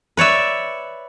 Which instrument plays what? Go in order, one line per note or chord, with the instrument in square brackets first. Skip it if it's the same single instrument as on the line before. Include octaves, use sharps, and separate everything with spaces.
[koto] B4 C#5 D5 E5